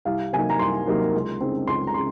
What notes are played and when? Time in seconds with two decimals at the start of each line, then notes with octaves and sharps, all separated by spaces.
0.05 C2 F5
0.33 C3 F#3 A#3 D#4 G#5
0.50 A#5
0.59 C2 C6
0.87 C3 F#3 A#3 D#4
1.14 C#2
1.41 C#3 G#3 C4 D#4
1.67 C#2 C6
1.87 A#5
1.94 C#3 G#3 C6